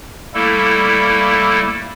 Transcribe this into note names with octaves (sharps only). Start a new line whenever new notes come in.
G3 A3 A#3 E4 A4